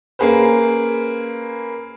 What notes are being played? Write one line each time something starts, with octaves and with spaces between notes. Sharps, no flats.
A#3 C#4 G#4 B4 C5